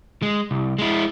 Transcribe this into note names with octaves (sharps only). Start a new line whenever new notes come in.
G#3
C2
G#3 E4